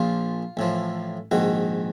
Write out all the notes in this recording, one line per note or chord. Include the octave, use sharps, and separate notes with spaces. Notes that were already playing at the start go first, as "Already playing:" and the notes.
Already playing: A#1 A#2 F3 F4
A1 A2 F3
A#1 G#2 D#3 F#4